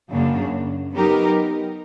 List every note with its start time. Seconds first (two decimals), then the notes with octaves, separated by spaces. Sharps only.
0.11 F#2 C#3 F#3 A#3 D4
0.93 F#3 B3 D#4 G4 A#4